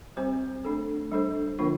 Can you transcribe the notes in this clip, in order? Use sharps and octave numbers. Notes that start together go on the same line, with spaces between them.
G3 C4 G4 C5
A3 D4 A4
G3 D4 A4 C5
D3 F3 A#3 D4 F4